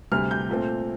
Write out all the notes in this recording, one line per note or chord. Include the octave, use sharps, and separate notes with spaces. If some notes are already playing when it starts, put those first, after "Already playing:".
D2 C3 G3 F6
G6
A#2 A3 C4